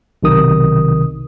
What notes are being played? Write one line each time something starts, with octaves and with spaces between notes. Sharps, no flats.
B1 C3 D#3 D#6